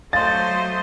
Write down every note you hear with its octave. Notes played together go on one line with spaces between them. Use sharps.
F#3 A3 C5 D#5 F5 C6 A6